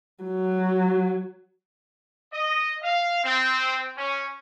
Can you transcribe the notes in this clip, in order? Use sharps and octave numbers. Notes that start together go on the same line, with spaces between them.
F#3
D#5
F5
C4
C#4